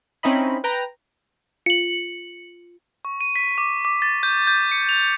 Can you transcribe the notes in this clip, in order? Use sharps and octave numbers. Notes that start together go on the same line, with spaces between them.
C4 C#4 D#4 E4 D#5 B5
B4 G5 A#5
F4 C#7 F#7
C#6
D#7
B6
D6
D6
A6
G6
G6
C#7
F7